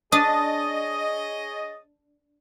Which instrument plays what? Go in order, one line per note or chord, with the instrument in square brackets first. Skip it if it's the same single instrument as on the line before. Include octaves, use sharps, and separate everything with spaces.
[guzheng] D4 [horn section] G#4 C#5 D#5 [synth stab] D#6 A6